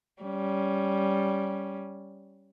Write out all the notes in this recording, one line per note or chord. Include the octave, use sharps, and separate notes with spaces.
G3 C#4